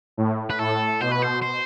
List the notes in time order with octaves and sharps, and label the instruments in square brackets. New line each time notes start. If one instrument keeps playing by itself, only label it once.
[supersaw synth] A2
[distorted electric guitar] B4
[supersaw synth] A2 [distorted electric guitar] A4
[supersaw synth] B2 [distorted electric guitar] C5
[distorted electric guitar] B4
C5
C5